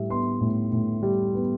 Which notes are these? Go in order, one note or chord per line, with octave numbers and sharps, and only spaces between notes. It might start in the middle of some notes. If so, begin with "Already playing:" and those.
Already playing: A2 G3 E5
B3 C6
A2
A2
G3
B3